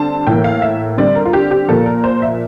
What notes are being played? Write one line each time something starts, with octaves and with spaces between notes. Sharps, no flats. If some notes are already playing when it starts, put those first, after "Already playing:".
Already playing: D3 G3 C4 A5
A2 E3 A#3 G5
F5
E5
D3 G3 C4 D5
A#4
F4
G4
G4
A#2 F3 A#3 A4
A#4
C5
E5